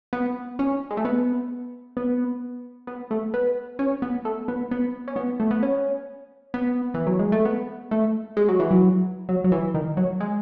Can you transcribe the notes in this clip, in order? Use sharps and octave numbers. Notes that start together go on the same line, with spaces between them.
B3
C#4
G#3
A3
B3
B3
B3
A3
B3
C#4
B3
A3
B3
B3
C#4
B3
A3
B3
C#4
B3
E3
F#3
G#3
A3
B3
A3
G#3
F#3
E3
F#3
F#3
F#3
E3
D#3
F#3
G#3